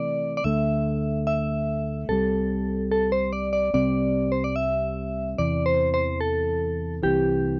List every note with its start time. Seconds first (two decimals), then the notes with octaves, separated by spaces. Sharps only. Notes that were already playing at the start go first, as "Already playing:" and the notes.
Already playing: C3 E3 A3 D5
0.37 D5
0.44 D2 D3 A3 E5
1.27 E5
2.09 C2 C3 G3 A4
2.91 A4
3.12 C5
3.33 D5
3.53 D5
3.74 C2 C3 G3 C4 D5
4.32 C5
4.44 D5
4.56 E5
5.38 E2 C3 E3 D5
5.66 C5
5.94 C5
6.21 A4
7.03 C2 C3 E3 G4